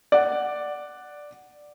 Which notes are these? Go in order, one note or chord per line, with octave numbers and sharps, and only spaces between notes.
D5 F#5